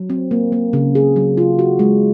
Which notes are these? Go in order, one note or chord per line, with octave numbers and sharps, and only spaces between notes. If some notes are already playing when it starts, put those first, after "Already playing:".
Already playing: F#3
C4
A#3
A#3
C#3
G#4
F#3
F4
F#4
G#3